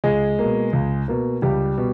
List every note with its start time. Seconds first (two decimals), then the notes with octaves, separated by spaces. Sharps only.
0.04 C#2 G#3 G#4
0.39 B2 A#3
0.73 C#2
1.08 B2 A#3
1.42 C#2 G3 G4
1.78 B2